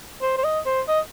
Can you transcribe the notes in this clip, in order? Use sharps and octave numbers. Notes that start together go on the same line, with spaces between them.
C5
C5
D#5
C5
D#5